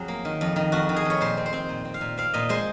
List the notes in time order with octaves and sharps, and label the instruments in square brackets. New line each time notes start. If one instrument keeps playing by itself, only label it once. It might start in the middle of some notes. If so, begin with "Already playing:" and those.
Already playing: [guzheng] F2 F#3 G#4
A#3
D#3
F2
D#3
F2 F#4
D#3
G#4
F2 C#5
A#2 C5
C4
C5
C4
A#2
C4
F5
A#2
C4 F5
A#2 D#5
G#3 C5